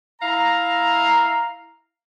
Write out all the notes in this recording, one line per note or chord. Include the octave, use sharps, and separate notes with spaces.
E4 F5 A#5